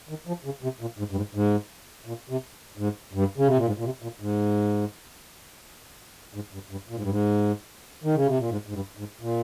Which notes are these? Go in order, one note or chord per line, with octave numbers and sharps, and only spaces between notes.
D#3
F3
C#3
C3
A#2
G#2
G2
G#2
G#2
A#2
C3
G#2
G2
C#3
C3
A#2
G#2
A#2
C3
A#2
G#2
G#2
G2
G2
A#2
G#2
G2
G#2
D#3
C#3
C3
A#2
G#2
G#2
G2
G#2
A#2